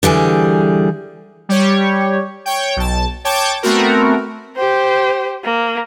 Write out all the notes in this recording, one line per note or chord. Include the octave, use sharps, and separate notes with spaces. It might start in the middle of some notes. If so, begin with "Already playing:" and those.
D3 E3 G3 G#4
G3 G4 C#5
C#5 G5
B1 A5
C#5 G5 A5 D6
A3 B3 C4 F#4 A#4
G4 C5
A#3